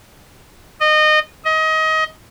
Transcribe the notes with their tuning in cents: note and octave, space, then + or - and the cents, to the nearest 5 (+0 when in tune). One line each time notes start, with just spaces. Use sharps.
D#5 -25
D#5 +25